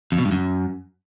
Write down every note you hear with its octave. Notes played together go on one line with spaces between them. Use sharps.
F2
B2
G2
F#2